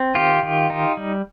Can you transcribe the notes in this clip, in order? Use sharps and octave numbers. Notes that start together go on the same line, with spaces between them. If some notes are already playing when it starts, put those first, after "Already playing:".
Already playing: C4
D#3 F4 G4
D#3
D#4
G3